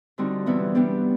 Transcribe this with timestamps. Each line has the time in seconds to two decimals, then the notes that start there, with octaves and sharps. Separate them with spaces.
0.18 D3 G3 C4 D#4 F#4
0.46 C3 E3 G3 B3 E4
0.75 G3 B3 D4 G4